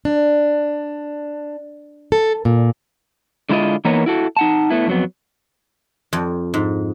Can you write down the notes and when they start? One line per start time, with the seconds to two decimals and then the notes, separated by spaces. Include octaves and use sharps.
0.05 D4
2.12 A4
2.45 A#2
3.50 D3 G#3 E4 F4 D#5
3.85 E3 A#3 B3 D#4 A#4 C#5
4.06 E4 F#4 A4
4.37 D#4 F#5 A5
4.70 A3 B3 E4
4.87 F2 F#3 B3
6.13 F2
6.54 G#2